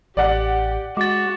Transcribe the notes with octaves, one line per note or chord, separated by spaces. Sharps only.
A1 G4 D5 F#5
G#3 F#4 D6 A6